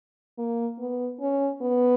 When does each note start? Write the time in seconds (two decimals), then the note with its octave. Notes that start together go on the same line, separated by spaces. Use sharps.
0.38 A#3
0.79 B3
1.20 C#4
1.62 B3